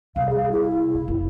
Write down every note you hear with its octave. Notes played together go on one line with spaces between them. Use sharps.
C3 G3 F5
G#4
E4
C#3
F#1